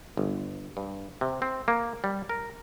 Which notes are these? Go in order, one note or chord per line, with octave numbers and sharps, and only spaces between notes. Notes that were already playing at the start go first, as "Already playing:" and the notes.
G1
G2
C3
C4
A#3
G3
A#4